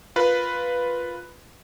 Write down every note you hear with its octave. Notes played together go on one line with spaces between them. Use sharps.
F4 A#4 B4